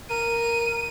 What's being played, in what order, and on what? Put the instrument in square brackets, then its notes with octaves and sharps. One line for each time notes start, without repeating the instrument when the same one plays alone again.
[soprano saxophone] A#4 [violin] D#7